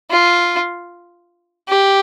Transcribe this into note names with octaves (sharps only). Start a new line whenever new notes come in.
F4
G4